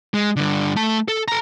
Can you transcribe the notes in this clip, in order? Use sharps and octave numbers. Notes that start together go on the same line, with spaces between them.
G#3
G2 D3
A3 A5
A4
A4 A#5